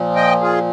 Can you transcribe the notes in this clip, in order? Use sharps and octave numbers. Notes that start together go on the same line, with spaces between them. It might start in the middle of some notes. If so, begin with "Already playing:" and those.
Already playing: A#2 F3
D#5 G5
F4 G#4